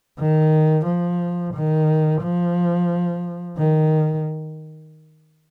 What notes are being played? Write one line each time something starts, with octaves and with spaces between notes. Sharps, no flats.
D#3
F3
D#3
F3
D#3